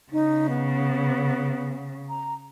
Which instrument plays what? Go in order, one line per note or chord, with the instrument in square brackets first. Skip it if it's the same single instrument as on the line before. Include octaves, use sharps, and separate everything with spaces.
[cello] C#3 [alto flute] D#4
[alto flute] B3
A#5